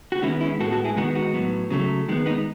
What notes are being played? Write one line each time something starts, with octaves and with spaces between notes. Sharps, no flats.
F#4
D#3 G#3 B3 C#4 E4
C#4 E4
A2 G#3 B3 F#4 A4
F#4 A4
E4 G#4
D#3 G#3 B3 D#4 F#4
D#4 F#4
A2 F#3 B3
C#3 F#3 A3
D#3 G#3 B3
B3 D#4